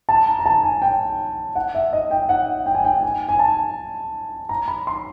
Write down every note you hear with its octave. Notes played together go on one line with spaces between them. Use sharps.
A5
A#5
A#5
A5
G#5
G5
F#5
E5
D#5
G5
F#5
G5
G#5
G5
G#5
G#5
A5
A#5
B5
C6